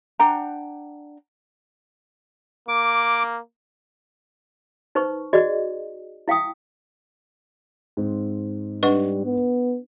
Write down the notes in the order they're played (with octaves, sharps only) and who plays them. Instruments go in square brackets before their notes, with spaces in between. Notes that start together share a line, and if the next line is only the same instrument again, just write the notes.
[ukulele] D4 F#5 G5 A#5
[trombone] A#3 [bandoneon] D6
[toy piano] D#4 B4 C5 C#6
F#4 G#4 D5 D#5
E4 F5 G5 D#6
[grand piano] G#2 C4
[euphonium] G3 [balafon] D4 F#5 [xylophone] B4 D#5 C#6
[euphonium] B3